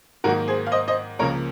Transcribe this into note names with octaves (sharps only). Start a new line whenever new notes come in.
G#2 D#3 F#3 A#3 F#4 A#4
G#4 C5
F5
C5 D#5
C5 D#5
C#2 C#3 F3 A#3 A#4 C#5